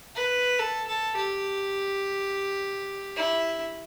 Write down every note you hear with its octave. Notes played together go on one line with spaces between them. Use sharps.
B4
A4
A4
G4
E4